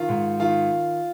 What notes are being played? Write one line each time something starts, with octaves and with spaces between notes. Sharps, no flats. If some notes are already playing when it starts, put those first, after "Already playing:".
Already playing: D#3 F4
G#2
D#3 F4